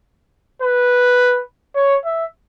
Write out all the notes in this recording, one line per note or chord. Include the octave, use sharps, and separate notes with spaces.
B4
C#5
E5